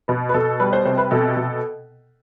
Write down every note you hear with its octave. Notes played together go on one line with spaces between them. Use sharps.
B2 B4
B4
B2 A4
G3 B4
C5
C3 C5
B4
B2 A4
B2